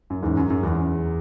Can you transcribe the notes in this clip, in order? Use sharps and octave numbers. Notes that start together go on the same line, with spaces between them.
F#2
E2 G#2
F#2
F#2
E2